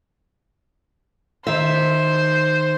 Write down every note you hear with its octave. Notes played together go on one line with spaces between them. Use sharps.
D#3 C5 E5